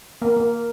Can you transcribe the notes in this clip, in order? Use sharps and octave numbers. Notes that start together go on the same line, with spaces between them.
A#3
A#3